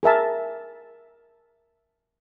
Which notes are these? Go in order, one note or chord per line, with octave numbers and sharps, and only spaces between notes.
G#4 A#4 E5 A5